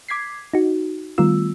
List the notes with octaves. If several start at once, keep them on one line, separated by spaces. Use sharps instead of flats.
D6 G#6 B6 C7
D#4 F#4
D#3 G3 A3 B3 F4 E6